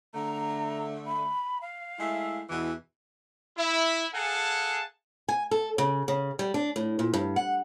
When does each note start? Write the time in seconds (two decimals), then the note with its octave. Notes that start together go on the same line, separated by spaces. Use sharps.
0.15 D3 A3 A#5
1.07 B5
1.61 F5
1.98 G#3 A3 E4
2.49 E2 B2 E3
3.58 E4
4.14 G#4 A4 F5 F#5 G#5 A5
5.29 G#5
5.51 A4
5.78 C#3
6.08 C#3
6.39 G3
6.54 D4
6.76 A2
6.99 A#2
7.14 G2
7.36 F#5